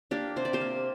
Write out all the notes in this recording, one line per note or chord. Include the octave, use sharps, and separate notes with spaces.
A#3 D4 G4
C3 C5
D5
G4 C5
A#3